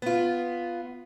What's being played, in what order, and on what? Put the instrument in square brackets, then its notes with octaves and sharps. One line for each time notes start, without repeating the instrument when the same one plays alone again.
[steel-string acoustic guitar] B3 F4